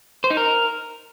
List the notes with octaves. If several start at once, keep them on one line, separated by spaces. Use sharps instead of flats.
C5
D#4
A#4